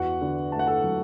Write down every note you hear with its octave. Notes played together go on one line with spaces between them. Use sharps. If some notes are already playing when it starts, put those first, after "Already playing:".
Already playing: E2 F#4 F#5
D3
A3 A5
F#5
A4 A5
F#3